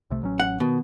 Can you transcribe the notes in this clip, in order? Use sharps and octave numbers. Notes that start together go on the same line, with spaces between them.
C2 C3 A3
A1 F#3 C#4
F#5
B2 D#3 B3